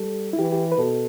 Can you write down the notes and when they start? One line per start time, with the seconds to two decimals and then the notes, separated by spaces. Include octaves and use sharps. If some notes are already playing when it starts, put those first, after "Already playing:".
Already playing: G3 A4
0.33 E4
0.39 E3 G4
0.52 G4
0.72 B4
0.78 B2 A4